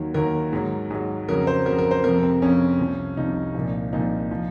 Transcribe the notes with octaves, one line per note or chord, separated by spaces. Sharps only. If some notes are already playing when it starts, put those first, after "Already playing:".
Already playing: D#2 D#3 F#3
D#2 D#3 F#3 A#4
G#2 F#3
G#2 F#3
F2 C#3 F#3 A#4
C5
F2 C#3 F#3 A#4
A#4
C5
F2 C3 F3 A#4
C4
F2 C3 F3 C#4
C2 C3 F3
C2 C3 F3 D#4
C2 A#2 F3
C2 A#2 F3 D#4
F3